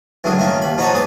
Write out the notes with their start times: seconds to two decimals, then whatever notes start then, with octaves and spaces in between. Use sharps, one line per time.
0.24 C#2 F#2 A2 D3 G#4
0.38 D#3 A3 A#3 C#4
0.62 D#2 B5
0.78 F3 D#4 F#4 C#5 G#5 A5
0.93 G#2 B3 G#4 D6